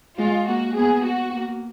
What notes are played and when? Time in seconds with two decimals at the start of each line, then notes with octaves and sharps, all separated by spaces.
0.19 G#3 F4
0.48 A#3 F#4
0.77 B3 G#4
1.06 F#4
1.35 A#3